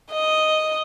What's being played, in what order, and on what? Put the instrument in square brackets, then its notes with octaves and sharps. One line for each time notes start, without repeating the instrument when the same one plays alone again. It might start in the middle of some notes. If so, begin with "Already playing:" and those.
[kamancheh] D#5